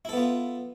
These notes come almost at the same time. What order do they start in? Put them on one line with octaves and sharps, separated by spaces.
E4 A4 B3 F4